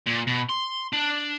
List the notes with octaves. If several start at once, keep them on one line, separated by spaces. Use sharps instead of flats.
A#2
B2
C6
D4